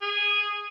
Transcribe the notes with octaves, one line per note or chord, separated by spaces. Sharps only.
G#4